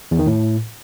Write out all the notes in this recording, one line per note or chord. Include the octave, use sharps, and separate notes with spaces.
E2
D#3
A2